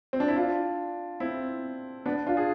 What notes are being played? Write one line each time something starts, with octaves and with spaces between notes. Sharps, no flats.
C4
D4
E4
D4 F4
C4 E4
B3 D4
D4 F4
G#4